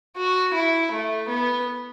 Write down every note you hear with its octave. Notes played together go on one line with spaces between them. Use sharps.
F#4
E4
A3
B3